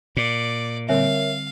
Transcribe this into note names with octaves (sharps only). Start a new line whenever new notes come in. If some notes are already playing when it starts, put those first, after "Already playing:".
A#2 D5
D3 G3 C4 A#4 C#5 E5 F5